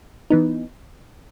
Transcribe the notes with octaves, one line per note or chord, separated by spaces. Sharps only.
E3 B3 D#4